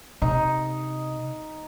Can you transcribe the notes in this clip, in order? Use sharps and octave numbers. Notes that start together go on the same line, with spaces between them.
C3 D#4